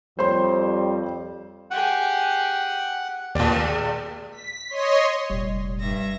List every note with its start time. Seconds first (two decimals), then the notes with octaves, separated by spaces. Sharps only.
0.19 F2 G3 C5 C#5 C6
1.71 G4 G#4 F#5
3.35 D#2 A#2 G#3 G4 D5
4.32 B6
4.70 C#5 D#5 C6
5.30 F1 A#2 G3
5.79 G2 E5 A#6